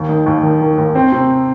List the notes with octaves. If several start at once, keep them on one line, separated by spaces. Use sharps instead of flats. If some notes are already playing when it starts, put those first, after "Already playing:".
Already playing: D#2
D#3
D#2
D#3
D#3
D#2
C4
C3